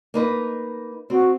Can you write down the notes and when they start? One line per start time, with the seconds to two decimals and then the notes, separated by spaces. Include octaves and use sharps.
0.14 A#3 D#4 B4
1.10 C4 F#4